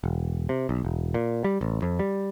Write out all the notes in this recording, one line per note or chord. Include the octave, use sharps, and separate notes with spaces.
E1
C3
B1
E1
A#2
G3
A1
F2
G3